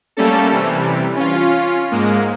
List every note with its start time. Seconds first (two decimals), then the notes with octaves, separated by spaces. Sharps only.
0.17 G3 A3 A#3 C#4 A4
0.52 C3 E3 G3
1.16 C#4 F4
1.91 G#2 G#3 A#3